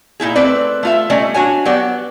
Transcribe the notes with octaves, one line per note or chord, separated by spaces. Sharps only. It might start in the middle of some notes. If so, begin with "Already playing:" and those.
A#2 D#4 E4 G#4
A3 C4 B4 D5
A3 F4 E5
G3 A3 C#4 D5 D#5
D4 F#4 C#5 G#5
F#3 B3 G4 D5